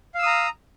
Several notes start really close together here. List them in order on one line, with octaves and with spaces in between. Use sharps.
F5 E6 D#6 A#5